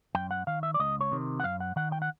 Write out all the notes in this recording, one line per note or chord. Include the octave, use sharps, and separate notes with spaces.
F#2 G5
F#5
D#3 F5
E5
D5
C#2 D#5
C#5
C3 D#3
F#5
F#2 F5
F#5
D#3 F#5
G5
F#5